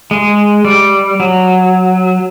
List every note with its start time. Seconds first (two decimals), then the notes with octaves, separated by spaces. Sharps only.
0.11 G#3
0.65 G3
1.20 F#3